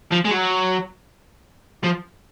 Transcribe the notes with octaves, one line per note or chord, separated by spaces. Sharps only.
F3
G#3
F#3
F3